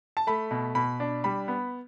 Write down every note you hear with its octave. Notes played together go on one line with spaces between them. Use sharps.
A5
A3 B5
B2
B2 B5
D4
G3 B5
B3